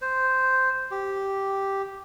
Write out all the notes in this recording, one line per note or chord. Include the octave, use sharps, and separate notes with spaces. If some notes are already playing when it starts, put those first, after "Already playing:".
C5
G4